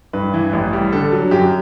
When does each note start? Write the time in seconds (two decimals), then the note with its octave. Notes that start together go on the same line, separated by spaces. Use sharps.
0.13 G2 B4
0.34 E3
0.53 A1
0.73 G3
0.92 D3 A4
1.12 F#3
1.31 F#2 G4